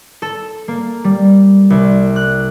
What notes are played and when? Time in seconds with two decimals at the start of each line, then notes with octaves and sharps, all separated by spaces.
0.22 A4
0.68 A#3
1.04 G3
1.70 C2
2.16 F#6